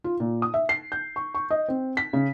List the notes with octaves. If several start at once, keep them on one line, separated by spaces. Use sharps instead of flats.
F4
A#2
D#6
E5
C7
G6
C#6
C#6
D#5
C4
B6
C#3